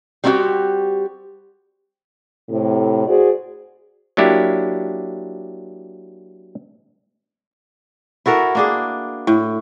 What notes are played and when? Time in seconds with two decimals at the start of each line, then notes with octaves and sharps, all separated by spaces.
0.24 G3 C4 C#4 E4 F#4 G4
2.50 A2 C3
3.07 F#4 G#4 C5 D5
4.17 F#3 A#3 D4 E4 G4
8.26 E4 F#4 A4 A#4
8.55 A#3 D4 G#4
9.27 A2